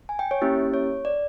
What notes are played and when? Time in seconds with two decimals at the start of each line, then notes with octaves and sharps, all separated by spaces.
0.09 G#5
0.19 G5
0.31 C#5
0.42 A#3 C#4 E4 G4
0.74 C#5
1.05 D5